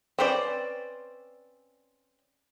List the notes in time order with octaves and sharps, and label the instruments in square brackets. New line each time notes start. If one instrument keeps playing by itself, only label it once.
[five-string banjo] C4 C#4 B4 C5 D5